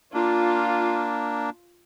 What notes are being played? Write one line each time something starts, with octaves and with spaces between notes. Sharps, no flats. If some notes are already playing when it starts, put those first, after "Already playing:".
A#3 D4 F4